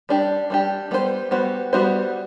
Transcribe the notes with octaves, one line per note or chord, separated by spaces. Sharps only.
G3 D4 G4
G3 D4 G4
G3 B3 F#4 C5
G3 B3 F#4 C5
G3 B3 F#4 C5